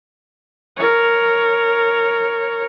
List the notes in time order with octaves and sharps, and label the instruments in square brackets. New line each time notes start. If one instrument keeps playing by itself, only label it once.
[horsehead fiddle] A#4 C#5